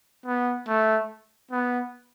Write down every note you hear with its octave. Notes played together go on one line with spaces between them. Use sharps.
B3
A3
B3